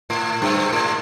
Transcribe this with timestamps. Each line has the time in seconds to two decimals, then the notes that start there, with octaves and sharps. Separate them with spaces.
0.10 A2
0.42 G2
0.73 A2